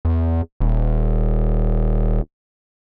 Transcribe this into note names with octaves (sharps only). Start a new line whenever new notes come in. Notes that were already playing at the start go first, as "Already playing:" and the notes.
E2
D#1